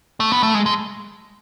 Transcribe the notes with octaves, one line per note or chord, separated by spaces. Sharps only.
A3
B3
A3
G#3
G#3